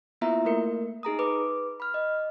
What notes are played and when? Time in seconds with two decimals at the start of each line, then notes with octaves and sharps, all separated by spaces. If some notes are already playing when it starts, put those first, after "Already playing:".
0.21 A#3 B3 E4 F4 E5 A#5
0.45 A3 A#3 A#4 C#7
1.03 D#4 G#4 A#5 D#6
1.19 B4 D6
1.80 B5 F6
1.94 D#5